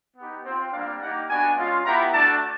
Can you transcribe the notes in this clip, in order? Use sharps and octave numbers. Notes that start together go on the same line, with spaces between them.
B3 D#4 G4
C4 F4
G3 A#3 D4 F5
A#3 D#4 G4 F#5
B3 D4 F#4 G#5
G#3 C#4 F4
B3 E4 G4 A#5
A3 D4 F#4 A5